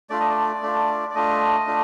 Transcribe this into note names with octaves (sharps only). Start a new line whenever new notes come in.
A3 D4 F4 D5
D#5
D5
A3 D4 F4
D5
A3 D4 F4 D#5
A3 D4 F4